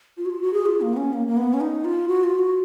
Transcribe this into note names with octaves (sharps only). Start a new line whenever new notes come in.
F4
F#4
F4
F#4
G#4
F4
A#3
B3
C#4
A#3
A#3
B3
C#4
D#4
F4
F#4
F4
F#4